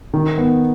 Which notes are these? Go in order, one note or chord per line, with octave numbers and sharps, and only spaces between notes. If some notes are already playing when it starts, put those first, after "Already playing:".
D#3
B3